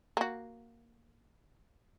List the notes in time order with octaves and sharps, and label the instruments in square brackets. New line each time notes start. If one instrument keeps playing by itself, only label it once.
[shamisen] A#3 F#4